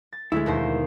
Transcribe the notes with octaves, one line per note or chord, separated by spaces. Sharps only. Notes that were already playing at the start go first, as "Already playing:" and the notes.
A6
D2 G#3 A3 E4
D#2 B2 C5